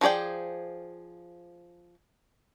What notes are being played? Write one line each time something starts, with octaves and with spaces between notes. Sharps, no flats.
F3 D#4 G#4 D5 G5